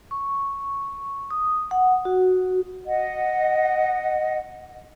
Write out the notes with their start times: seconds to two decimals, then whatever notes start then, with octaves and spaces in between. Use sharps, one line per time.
0.11 C#6
1.31 D#6
1.71 F#5
2.05 F#4
2.86 D#5 F#5